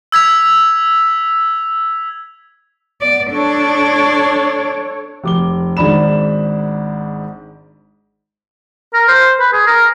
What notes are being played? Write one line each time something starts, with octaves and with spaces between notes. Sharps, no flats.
E6 G#6 B6 F7
B3 D5
D4 A4 C#5
F1 D6 G7
G#1 G#2 D4 B5 E7
A#4
C5
B4
G#4
A#4